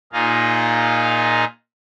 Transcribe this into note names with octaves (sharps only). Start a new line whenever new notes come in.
A#2 A#3 D#4 F4 G#4 F5